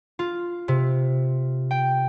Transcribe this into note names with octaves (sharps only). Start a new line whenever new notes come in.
F4
C3
G5